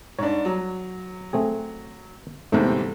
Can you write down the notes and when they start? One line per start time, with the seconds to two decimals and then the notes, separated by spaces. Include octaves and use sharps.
0.19 G#2 D4 C#5
0.45 F#3
1.33 A3 C4 G#4
2.52 G1 E2 G#2 C3 A3